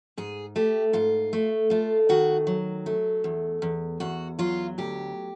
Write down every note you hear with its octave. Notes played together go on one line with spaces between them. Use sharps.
G#2 G#4
A3 G4
G#2 F4
A3
A3 F4
D#3 F#4
F#3
A3
E2
E2
E2 F#4
F#3 F4
D2 G4